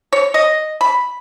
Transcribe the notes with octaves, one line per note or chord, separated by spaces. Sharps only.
C#5
D#5
B5